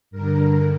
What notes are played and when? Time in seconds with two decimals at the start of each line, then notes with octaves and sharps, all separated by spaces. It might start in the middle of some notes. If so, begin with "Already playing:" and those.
0.11 G2 D3 A#4